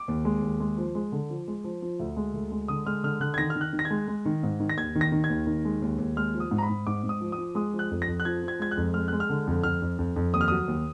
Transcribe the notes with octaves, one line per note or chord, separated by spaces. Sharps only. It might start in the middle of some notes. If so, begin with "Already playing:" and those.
Already playing: D6
D#2
G#3
D#2
G#3
F3
G#3
D3
F3
G#3
F3
F3
D2
G#3
D2
G#3
D3 D#6
G#3 F6
D3 F6
D3 F#6
G#6
D#3 A#6
F6
D#3
F#6
D#3
A#6
G#6
G#3
G#3
D#3
G#2
D#3
A#6
D#2 G#6
D#3
A#6
D#3
G#6
D#2
D#3
G#3
D#2
D#2
G#3 F6
F3
D#6
G#2
A#5
B5
G#2
G#2 D6
G#2
D#6
F3
D#6
F3
G#3 D#6
F3
F#6
F2
A#6
F2
F#6
F3 G#6
F3
G#6
G#3 G#6
F#6
F2
G#3 F6
G#3 F#6
F6
D3
F2
F2 F6
F2
F2
F2
D#2 D#6
F6
F#3 D#6
D#2